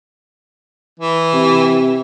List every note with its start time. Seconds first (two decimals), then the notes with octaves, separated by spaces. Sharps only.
1.00 E3
1.34 C3